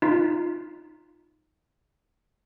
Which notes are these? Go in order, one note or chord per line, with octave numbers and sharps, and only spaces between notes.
D#4 F4